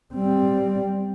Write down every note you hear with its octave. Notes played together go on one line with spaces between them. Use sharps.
G3 C4